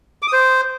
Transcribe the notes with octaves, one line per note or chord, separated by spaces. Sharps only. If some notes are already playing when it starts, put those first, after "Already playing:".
D6
D#6
C5